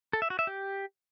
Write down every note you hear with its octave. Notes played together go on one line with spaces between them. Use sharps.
A4
E5
F#4
E5
G4